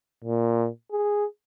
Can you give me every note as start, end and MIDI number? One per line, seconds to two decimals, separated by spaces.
0.24 0.68 46
0.92 1.25 68